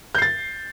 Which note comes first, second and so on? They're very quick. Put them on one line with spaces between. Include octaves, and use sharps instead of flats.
G6 C7 A6